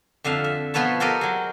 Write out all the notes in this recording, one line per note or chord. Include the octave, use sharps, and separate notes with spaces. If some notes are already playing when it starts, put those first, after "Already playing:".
F2 D3 E5 F5
E5
B2 F3 B3 B4 C#5 A5
F#4 G4 A4 A#4 C5 D#5
F#3 G#3